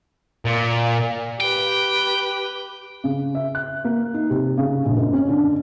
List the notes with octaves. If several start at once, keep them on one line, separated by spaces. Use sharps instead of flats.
A#2
G4 B4 G5
C#3
E5
F#6
A#3
D#4
C3
C#3
A#1
F#1
C#4
D3